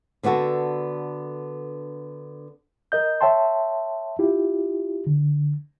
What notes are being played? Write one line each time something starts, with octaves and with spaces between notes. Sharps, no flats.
D3 B3 D4 F#4 A4
A#4 D#5 G6
C#5 E5 G5 A5 C6
E4 F4 G4
D3